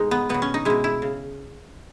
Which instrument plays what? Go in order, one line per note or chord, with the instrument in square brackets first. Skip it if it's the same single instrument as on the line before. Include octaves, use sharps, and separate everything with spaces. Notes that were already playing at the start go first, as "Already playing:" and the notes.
Already playing: [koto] B2 G#3 D#4
B3
B2 F#3 B3
C#4
D#4
B2 G#3 E4
E4
C#3